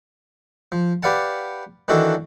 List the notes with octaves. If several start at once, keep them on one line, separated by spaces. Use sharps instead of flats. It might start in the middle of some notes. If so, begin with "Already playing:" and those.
F3
G4 B4 D5 F5 F#5 A5
D#3 E3 D4 F#4 A4